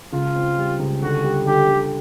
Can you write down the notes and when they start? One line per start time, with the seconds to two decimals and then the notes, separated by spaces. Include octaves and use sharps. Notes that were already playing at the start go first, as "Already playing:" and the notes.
0.13 C#2 F4
0.35 C4
0.58 G3
0.80 C#2
1.02 D3 F#4
1.24 G3
1.46 D3 G4
1.69 D3